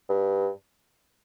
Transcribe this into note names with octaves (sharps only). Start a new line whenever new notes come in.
G2